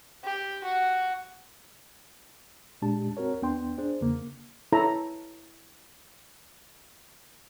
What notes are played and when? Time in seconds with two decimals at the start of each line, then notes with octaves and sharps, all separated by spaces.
0.24 G4
0.64 F#4
2.82 A#2 G#3 D4 G4 A5
3.17 C4 F#4 A#4 C#5
3.42 D#2 B3 D4 G5 C6
3.78 D4 G#4 C5
4.01 E2 C#3 A#3
4.72 E4 A4 C#5 A#5 B5